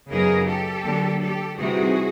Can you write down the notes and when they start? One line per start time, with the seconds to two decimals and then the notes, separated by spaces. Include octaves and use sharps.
0.10 F#2 C#3 F#3 B3 D#4 G#4 A#4
0.48 G4 A4
0.84 D3 F#3 A#3
1.21 G4 A4
1.58 C3 E3 G3 C4 D#4 F#4 G#4